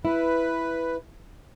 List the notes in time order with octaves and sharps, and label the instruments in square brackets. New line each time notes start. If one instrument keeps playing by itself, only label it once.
[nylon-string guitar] E4 [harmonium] B4